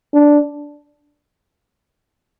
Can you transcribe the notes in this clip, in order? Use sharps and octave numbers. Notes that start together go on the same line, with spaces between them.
D4